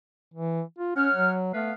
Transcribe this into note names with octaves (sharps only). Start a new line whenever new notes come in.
E3
F4
C#4 C#5 F#5 F6
F#3
A3 B3 B4 F5